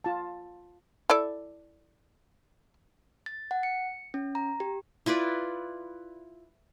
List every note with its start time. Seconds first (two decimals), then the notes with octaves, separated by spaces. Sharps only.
0.04 F4 A5
1.10 E4 A4 D5
3.26 A6
3.51 F#5
3.63 C#7
4.14 C#4
4.35 A#5
4.60 G4
5.06 E4 F4 B4 D5